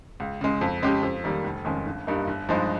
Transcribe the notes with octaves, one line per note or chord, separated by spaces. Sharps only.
C#2
C#3 G#3
F2
C#3 G#3 C#4 G4
F2
D#3 G3 A#3
F1
F2 D#3 G#3 C#4
G1
G2 G3 A#3 D#4
G1
G2 F3 G#3 D#4